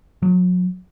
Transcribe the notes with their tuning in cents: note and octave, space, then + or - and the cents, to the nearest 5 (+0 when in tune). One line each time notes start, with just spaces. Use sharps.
F#3 -35